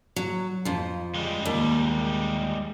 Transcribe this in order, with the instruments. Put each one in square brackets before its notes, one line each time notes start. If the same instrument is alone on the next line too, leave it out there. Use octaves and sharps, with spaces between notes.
[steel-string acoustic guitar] F#3
F2 F3
[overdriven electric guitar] G3 G#3
[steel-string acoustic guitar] D#2